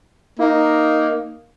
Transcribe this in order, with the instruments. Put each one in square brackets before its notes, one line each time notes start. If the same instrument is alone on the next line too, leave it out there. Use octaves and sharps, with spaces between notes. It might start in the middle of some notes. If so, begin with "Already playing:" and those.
[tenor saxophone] A#3 [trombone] D#4